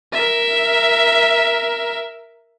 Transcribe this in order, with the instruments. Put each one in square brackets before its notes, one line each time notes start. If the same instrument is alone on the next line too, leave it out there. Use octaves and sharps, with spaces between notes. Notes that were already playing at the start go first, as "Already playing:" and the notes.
[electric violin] A#4 E5